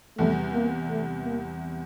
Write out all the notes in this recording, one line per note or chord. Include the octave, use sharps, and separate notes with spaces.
E2 C3 G3 A3
A#3
A3
A#3